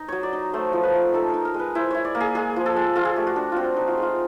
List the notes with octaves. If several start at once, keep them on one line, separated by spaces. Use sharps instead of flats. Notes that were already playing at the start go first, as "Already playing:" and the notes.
Already playing: D#4
F#3 C#5
D5
D#4
A3 C5
F3
B4
A3
D#4 A4
D#4 A#4
A#4
G#3
B4
E4 C5
E4 C#5
D5
A#3
G#4
G#3 G#4
F3
A4
G#3
F4 A4
G#4
A3 G4
F#4
D4
C4 F4 F#4
D#4
F4
G#3 F4